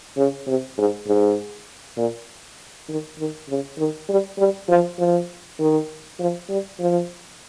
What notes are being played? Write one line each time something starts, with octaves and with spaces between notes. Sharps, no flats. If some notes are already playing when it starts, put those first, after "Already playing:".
C#3
C3
G#2
G#2
A#2
D#3
D#3
C#3
D#3
G3
G3
F3
F3
D#3
F3
G3
F3